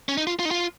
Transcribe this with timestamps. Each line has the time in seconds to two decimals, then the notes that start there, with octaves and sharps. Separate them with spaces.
0.09 C#4
0.18 D#4
0.27 F4
0.39 F4
0.45 D#4
0.51 F4